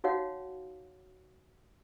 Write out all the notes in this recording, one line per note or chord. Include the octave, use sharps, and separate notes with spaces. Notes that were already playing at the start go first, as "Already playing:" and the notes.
D#4 F#4 C#5 F5 F#5